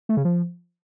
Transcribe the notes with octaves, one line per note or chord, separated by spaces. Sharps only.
A3
C#3
F3